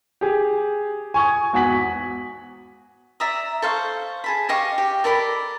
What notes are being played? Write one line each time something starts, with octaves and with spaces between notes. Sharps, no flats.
G4 G#4
G#5 C#6 D#6 G#6
G#1 E2 F#4 G#5 B6 F#7
D5 E5 A#5 D#6
A4 C5 F5 C#6
G#4 A5 B5
G4 D#5 F5 C#6
G4
A4 A#4 D5 B5